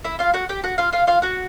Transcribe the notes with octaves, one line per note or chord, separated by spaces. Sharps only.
E4 E5
F4 F5
F#4 F#5
G4 G5
F#4 F#5
F4 F5
F4 F5
F4 F5
F#4 F#5